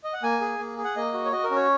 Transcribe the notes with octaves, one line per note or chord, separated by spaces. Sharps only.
D#5
F#5
A#3 G#5
G#4
A#3
G#4
F#5
A#3 D#5
F#4
C#5
F#4 D#5
A#4
C#4
C#5